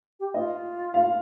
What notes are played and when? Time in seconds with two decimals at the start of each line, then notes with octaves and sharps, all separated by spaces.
0.20 G4
0.34 F4 D#5
0.94 F5